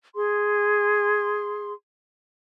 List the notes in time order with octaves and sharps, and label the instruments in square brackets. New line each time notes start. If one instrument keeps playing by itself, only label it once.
[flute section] G#4 C6